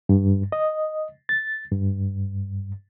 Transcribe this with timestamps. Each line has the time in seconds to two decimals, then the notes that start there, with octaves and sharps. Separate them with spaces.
0.09 G2
0.52 D#5
1.29 A6
1.72 G2